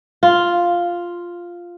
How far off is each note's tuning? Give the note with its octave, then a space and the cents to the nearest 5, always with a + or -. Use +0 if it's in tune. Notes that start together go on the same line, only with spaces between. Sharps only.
F4 +0